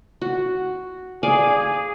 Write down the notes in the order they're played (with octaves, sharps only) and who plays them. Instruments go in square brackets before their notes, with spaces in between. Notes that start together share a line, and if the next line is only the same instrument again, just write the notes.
[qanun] F#4
[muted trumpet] G#4 [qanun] D5 F5 G#5